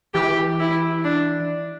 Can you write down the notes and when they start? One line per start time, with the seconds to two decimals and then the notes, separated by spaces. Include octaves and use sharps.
0.14 E3 G4
0.60 E4
1.04 D4